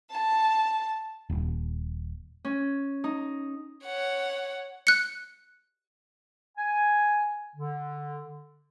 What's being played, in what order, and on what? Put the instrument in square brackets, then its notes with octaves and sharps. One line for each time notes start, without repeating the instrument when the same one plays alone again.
[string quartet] A5
[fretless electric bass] D#1
[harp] C#4
D#4
[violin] C#5 F#5
[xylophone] F#6 C#7
[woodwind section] G#5
D3